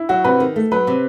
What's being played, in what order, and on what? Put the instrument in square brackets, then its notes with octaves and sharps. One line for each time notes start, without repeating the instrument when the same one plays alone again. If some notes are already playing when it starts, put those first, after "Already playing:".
Already playing: [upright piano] E4
[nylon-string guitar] F#3 [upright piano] F#4
[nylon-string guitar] C3 [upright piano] B4
[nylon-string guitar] D#3
A3
[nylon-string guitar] F#3 [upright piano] B4
[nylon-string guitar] C3